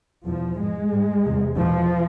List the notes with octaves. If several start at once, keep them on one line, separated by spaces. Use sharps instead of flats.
E2 B2 F3
G#2 G#3
G#2
E2 C3
E2 B2 F3